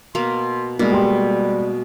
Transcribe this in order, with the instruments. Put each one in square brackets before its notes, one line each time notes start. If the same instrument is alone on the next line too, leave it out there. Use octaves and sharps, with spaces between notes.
[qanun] B2 A#3 [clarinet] C6
[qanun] B2 [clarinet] G3 [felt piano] G#3 A#3
[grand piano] G4 C6